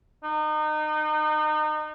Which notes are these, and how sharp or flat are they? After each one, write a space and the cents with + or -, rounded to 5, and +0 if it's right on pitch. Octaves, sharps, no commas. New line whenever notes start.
D#4 -30